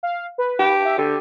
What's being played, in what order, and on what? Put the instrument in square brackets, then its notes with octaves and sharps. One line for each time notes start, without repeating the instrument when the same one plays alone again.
[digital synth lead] F5
B4
[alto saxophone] G4
[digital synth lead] E5
[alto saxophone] D3 [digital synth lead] G4